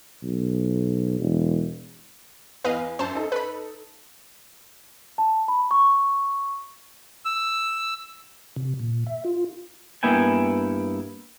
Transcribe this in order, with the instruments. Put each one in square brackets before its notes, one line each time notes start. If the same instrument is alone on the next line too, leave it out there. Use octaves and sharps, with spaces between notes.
[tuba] B1
E1
[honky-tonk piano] E2 [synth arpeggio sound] B4 D#5 F5
[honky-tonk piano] F#2 [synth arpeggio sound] C5 A5
[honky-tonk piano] D#4 A4
[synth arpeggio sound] B4 B5
[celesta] A5
B5
C#6
[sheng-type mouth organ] E6
[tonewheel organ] C3
A#2
E5
F4
[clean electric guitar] G2 A#3 B3 E4 G5 G#5